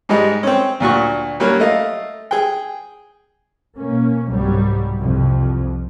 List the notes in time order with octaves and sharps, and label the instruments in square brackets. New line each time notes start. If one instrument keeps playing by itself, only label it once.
[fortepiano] G#2 G3 G#3 D#4
C4 C#4
D2 A#2 F#4 C#6
F#3 G3 A#3 C#4 A#4
A3 D#5 F5
G#4 G5
[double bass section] B2 A#3 C#4
C2 G#2 F#3 G3
C2 F2 F3